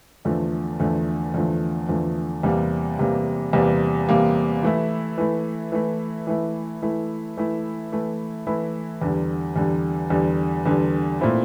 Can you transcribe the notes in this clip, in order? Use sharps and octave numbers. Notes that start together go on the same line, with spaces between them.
E2 D3 F3 A3
E2 D3 F3 A3
E2 D3 F3 A3
E2 D3 F3 A3
E2 C3 G3 A#3
E2 C3 G3 A#3
E2 C3 G3 A#3
E2 C3 G3 A#3
E3 A3 E4
E3 A3 E4
E3 A3 E4
E3 A3 E4
E3 A3 E4
E3 A3 E4
E3 A3 E4
E3 A3 E4
E2 D3 G3
E2 D3 G3
E2 D3 G3
E2 D3 G3
A#2 A3 C4 E4